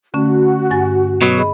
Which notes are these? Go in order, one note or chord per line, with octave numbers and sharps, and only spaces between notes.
D3 A3 C#4 F#4
G2 G#5 A6
B2 F#3
G#4 D#5 B5